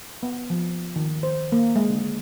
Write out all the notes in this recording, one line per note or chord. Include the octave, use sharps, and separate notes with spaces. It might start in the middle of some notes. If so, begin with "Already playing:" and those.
B3
F3
D#3
C5
A#3
G#3
D3